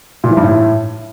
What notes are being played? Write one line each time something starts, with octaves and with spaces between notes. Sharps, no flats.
A#2
E3
G2
A2